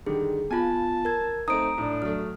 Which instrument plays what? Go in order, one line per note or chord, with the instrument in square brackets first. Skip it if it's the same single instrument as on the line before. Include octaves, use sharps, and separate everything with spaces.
[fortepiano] D3 D#3 G3 [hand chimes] G#4
[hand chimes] B3 F4 [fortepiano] G#5 B5 [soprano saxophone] A5
[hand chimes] A#4 G#6
[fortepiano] A3 C4 D#4 [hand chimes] A#5 [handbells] D#6 D7
[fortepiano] A2 [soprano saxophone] D4
[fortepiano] F#3 A3 [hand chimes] F6